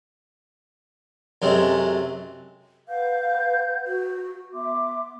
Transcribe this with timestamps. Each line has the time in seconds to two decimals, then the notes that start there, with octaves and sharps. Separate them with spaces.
1.42 F#2 C3 G#3 A3
2.88 B4 F5 F#5 G6
3.87 F#4
4.53 B3 E5 C6 D6